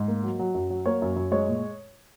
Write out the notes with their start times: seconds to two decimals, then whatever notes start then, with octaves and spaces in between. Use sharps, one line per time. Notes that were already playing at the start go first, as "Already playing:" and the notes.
Already playing: G#2
0.08 A#3
0.24 F#3
0.39 F#3
0.54 F#2
0.70 F#3
0.86 A#3 C#5
1.02 F#2
1.16 F#2
1.32 G#3 C#5
1.48 A#2